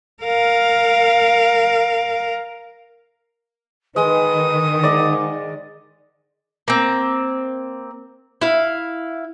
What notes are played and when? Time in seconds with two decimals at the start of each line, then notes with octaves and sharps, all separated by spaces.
0.23 A#4 F5
3.96 D#3 G#3 B4 D#6
4.83 G#2 D5 D#5
6.68 A#3 C4
8.41 E4 F5